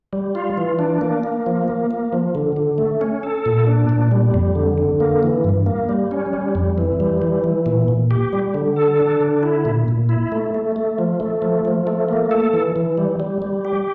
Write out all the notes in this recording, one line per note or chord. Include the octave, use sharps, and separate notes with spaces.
G3
F4
E3
D4
A#3
A#3
F3
A#3
A#3
F3
D3
D3
A3
C#4
A4
A#2
D4
A#2
G3
F2
D3
D3
A#3
E3
G2
A#3
G3
C#4
G3
F2
E3
G3
E3
E3
A#2
A#2
G4
G3
D3
A4
D4
D3
E4
A#2
A#2
E4
A3
A3
A3
F3
A3
F3
F3
A3
A#3
A4
E3
E3
G3
G3
G3
G4